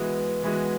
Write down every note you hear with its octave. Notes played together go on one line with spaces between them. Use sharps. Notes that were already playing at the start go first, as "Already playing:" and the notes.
Already playing: E3 G#3 B3 F#4
E3 G#3 B3 F#4